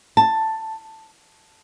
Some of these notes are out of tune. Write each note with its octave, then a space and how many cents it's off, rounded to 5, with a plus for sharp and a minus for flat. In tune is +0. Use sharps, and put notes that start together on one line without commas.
A5 +10